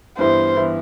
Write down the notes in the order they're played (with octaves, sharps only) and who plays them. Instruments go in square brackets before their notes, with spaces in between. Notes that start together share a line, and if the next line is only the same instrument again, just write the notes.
[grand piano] G2 E3 B3 E4 [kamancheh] C5
[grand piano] E3 B3 E4